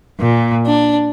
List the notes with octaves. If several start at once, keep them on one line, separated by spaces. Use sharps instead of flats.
A#2
D4